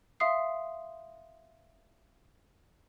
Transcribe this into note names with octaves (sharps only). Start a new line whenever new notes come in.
E5 F5 C6 D#6 C7